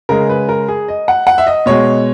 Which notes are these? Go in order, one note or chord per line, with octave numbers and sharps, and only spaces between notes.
C#3 G#3 A#4
B4
A#4
G#4
D#5
F#5
F#5
E5
D#5
B2 G#3 C#5